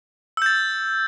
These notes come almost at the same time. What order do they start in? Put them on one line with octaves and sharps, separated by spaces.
E6 G6 A6